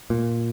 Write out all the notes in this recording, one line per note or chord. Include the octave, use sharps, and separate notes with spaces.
A#2